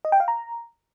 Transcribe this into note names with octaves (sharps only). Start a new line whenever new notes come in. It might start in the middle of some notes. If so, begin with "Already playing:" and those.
D#5
G5
F5
A#5